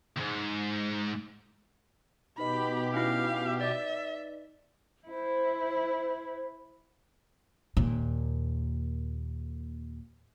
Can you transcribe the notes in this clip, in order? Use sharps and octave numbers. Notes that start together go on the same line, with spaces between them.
D#2 G#2
B2 D#4 G4 B4 D#5 B5
C#4 E4 F5
D5 E5 A6
E4 C5
D#2 A#2